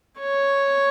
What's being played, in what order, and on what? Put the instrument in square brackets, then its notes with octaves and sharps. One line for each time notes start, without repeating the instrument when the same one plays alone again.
[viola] C#5